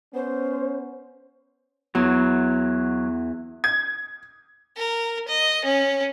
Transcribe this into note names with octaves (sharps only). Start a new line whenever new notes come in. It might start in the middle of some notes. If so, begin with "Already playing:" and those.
B3 C#4 C5
E2 F#3
G#6
A#4
D#5
C#4